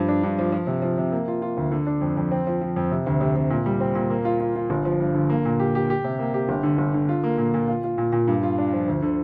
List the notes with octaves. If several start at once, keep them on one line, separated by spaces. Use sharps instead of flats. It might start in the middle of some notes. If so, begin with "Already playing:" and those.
Already playing: G2 F3
D4
G2
F3
F3
C3
F3
C3
A#3
F4
F4
D2
D3
D4
F2
F2
C4
F3
F3
F2
C3
D2
C3
C3
A#2
G3
C4
A#2
A#3
F4
F4
F4
G1
F3
G2
D3
A#3
A#2
G4
G4
G4
C3
A#3
G4
G1
D3
G1
D3
F4
A#3
A#2
A#2
F4
F4
A#2
A#2
G2
F4
D4
F3
D2
D3